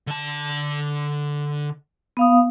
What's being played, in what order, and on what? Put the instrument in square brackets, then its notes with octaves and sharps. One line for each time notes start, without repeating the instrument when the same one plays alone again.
[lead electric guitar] D3 A5
[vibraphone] B3 F5 D#6